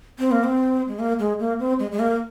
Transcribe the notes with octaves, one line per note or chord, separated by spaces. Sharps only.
C4
A#3
C4
G#3
A#3
G#3
A#3
C4
G#3
G#3
A#3